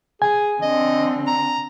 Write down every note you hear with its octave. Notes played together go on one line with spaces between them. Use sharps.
G#4 G#5
D3 C4 D#5
A#5